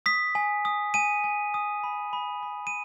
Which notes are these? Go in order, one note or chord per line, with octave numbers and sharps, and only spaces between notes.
D#6 B6
G#5
D#6
G#5 D#7
G#5
D#6
B5
B5
B5
D#7